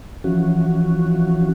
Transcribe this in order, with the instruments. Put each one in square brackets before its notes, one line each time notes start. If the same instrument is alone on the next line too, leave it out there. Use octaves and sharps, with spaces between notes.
[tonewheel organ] E3 F3 C#4 F#4